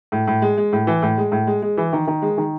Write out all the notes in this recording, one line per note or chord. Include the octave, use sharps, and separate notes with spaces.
A2
A2
G#3
G#3
A2
E3
A2
G#3
A2
G#3
G#3
E3
D#3
D#3
G#3
D#3